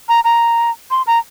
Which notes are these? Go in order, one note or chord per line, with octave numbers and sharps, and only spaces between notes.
A#5
A#5
C6
A#5